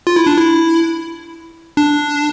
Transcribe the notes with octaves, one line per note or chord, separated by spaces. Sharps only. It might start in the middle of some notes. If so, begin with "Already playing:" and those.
F4
E4
D4
E4
D4